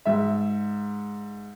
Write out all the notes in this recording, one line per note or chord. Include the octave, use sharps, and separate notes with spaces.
G#2 E5